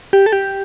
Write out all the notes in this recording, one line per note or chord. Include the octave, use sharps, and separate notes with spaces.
G4
A4
G4